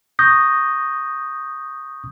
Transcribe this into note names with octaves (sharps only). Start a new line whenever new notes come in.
C#6 D#6 G6 A#6